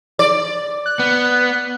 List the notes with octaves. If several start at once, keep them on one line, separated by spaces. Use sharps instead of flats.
D5
F#6
B3